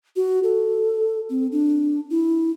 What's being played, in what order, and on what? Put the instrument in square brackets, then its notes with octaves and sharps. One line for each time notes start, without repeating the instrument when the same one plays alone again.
[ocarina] F#4
A4
C4
D4
E4